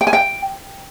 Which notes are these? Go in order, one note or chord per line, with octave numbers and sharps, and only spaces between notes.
G5
G#5
G5